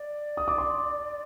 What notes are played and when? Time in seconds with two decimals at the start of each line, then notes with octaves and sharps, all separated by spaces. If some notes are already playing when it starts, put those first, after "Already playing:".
Already playing: D5
0.37 D#6
0.48 D6
0.58 C6